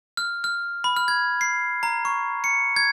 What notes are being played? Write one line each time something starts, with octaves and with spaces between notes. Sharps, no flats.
F6
F6
B5
F6
G#6
C7
A#5
C#6
C#7
G#6